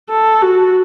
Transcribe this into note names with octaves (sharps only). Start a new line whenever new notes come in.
A4
F#4